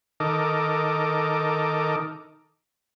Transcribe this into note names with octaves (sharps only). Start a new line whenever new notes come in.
D#3 A4 A#4 D#5 D6